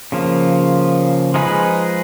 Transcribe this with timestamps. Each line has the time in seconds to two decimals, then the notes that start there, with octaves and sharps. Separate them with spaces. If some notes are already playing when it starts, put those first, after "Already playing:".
0.12 C#3 F3 A#3
1.34 F3 G#3 D#4 G#4 B4